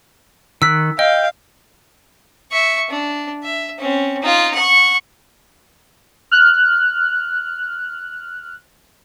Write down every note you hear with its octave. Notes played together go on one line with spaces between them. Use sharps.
D#3 E6 F#6 B6
D#5 F5 G5
E5 C#6
D4
E5
C4 C#4
D#4 F4
F#5 C#6
F6 F#6